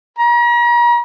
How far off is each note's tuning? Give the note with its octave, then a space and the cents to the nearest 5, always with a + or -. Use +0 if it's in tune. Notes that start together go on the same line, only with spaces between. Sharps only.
A#5 +40